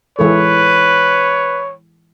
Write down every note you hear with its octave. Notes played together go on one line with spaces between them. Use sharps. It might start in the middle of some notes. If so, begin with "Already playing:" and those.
E3 G#3 A4 B4 C#5